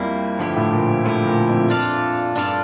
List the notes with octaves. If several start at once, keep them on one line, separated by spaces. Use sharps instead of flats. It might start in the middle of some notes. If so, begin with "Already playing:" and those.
Already playing: F2 G3 A#3 E4
G2 D3 F3 A3 E4 G4
A2
A#2
D3 F3 A3 E4 G4
A#2
F2
D4 F4 A4 D5 F5
G2 D4 F4 A4 D5 F5